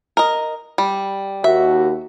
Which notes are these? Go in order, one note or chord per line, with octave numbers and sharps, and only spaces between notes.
A#4 D#5
G3
D#2 F#4 E5